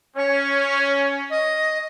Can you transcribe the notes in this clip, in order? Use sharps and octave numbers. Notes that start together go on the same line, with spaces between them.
C#4 C#5
D#5